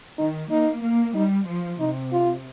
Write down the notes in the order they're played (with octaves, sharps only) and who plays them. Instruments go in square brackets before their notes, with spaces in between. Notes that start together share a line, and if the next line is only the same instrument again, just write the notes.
[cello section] D#3 [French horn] D#4
[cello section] A#3 [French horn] D#4
[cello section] A#3
[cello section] G3 [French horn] D#4
[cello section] F3
[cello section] C3 [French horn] D#4
[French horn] F4